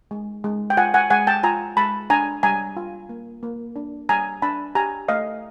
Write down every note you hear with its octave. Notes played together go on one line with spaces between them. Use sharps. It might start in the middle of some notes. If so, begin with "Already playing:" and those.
G#3
G#3
G5
F4 F#5 G#5
F#5 G#5
G#3 F#5 G#5
G5 A5
F4 G#5 A#5
G#3 A5 B5
D4 G#5 A#5
G3 G#5 A#5
F4
A#3
A#3
D4
G3 G#5 A#5
D4 A5 B5
G4 G#5 A#5
A3 D#5 F5